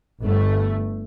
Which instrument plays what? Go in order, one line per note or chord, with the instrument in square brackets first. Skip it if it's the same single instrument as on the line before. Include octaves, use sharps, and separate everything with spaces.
[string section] G1 A3